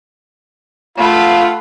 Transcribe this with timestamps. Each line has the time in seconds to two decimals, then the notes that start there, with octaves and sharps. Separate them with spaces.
0.98 A3 F4 F5 F#5 B5